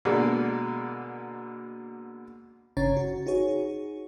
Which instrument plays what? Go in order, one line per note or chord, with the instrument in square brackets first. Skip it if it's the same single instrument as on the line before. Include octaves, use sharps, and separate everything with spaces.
[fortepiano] B2 D3 G#3 A#3
[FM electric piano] G1 C#3 C#4 C#5 A#5 A6
F#4
D#4 F#4 G#4 C#5